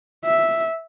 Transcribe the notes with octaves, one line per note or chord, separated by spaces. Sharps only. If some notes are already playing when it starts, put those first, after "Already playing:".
E5